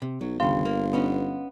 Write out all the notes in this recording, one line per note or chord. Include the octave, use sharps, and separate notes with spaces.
C3
B1 F#3
G1 D#2 C#3 F5 C6
A#3
B3 C#4 D#4